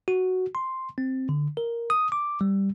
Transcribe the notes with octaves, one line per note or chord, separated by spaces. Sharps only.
F#4
C6
C4
D3
A#4
D#6
D6
G3